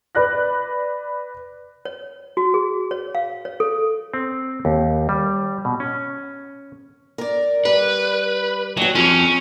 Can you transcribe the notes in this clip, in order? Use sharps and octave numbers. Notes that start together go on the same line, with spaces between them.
B4 D5 F#6 A#6
C#5
F#4
G#4
C#5
F5
C#5
A4
C4
D#2
G3
B2
C#4
A#4 D5
G3 B4
D#2 F#3 F#4
C4 C#4 F4 G#4